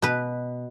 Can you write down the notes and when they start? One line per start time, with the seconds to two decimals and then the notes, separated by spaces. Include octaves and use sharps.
0.02 B2 B4